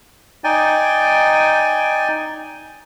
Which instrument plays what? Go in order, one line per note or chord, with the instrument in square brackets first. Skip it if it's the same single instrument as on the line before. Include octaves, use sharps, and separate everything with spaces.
[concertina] D#4 D5 G5 G#5